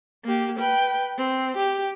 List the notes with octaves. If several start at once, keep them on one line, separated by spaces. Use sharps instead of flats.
A#3 G4
B4 G5
C4
G4